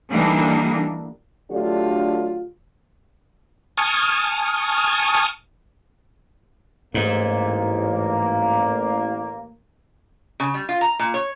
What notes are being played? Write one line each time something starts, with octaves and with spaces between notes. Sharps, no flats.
D3 E3 G3 A#3 D4 D#4
D3 F#3 A3 D4 F4 G4
G#5 A5 C#6 D#6 F6
A1 G#2 A#3
C#3
G3
F4
A#5
A#2
C#5